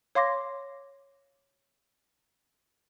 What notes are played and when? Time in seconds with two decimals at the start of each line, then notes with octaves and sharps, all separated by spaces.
0.15 C#5 F5 C6 D6 A#6